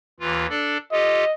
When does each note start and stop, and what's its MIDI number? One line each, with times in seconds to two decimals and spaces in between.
0.20 0.46 39
0.20 0.46 52
0.20 0.46 65
0.50 0.78 62
0.50 0.78 69
0.50 0.78 74
0.92 1.24 65
0.92 1.24 67
0.92 1.24 69
0.92 1.34 75